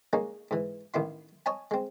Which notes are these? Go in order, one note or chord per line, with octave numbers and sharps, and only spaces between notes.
G#3 A#3 C#4 D#4
G#2 E3
A1 D#3 E4 C6
C#5 D#5 G#5 A5
G#3 C4